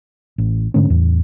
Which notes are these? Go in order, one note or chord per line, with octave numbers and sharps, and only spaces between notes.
A1
G#2 D3 A3 C#4
E2 A2